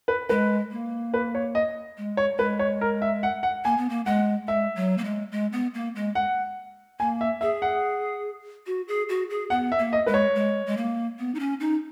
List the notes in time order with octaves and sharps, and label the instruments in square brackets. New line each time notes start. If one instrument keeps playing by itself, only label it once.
[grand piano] B4
[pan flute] G#3 [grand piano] B4
[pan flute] A#3
[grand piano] B4
C#5
D#5
[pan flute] G#3
[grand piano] C#5
[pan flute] G#3 [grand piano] B4
[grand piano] C#5
A#4
E5
F#5
F#5
[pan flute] A#3 [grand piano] G#5
[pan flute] B3
A#3
[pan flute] G#3 [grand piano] F#5
[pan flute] G#3 [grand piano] E5
[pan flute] F#3
A#3
G#3
G#3
B3
A#3
G#3
[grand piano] F#5
[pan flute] A#3 [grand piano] G#5
[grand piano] E5
[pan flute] G#4 [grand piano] E5
[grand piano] F#5
[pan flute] F#4
G#4
F#4
G#4
[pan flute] B3 [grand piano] F#5
[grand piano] E5
[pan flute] A#3
[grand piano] D#5
[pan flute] G#3 [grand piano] B4
[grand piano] C#5
[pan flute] G#3
G#3
A#3
B3
D#4
C#4
D#4